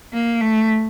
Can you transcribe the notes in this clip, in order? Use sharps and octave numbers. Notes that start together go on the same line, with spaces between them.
A#3
A3